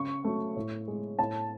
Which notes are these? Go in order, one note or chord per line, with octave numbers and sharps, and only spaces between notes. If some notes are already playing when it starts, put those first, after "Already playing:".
Already playing: C#3 C#6
F#3 A3
A2
G#3
A2 A5